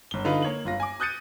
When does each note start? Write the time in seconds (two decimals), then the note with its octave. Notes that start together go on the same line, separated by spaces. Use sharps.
0.11 G1 G7
0.25 D3 D#4 F4 B4
0.42 A#3 C#5 F#7
0.65 G1 F4 A#6
0.80 G#5 D6
1.00 D#6 F#6 G6 A6 C#7 D#7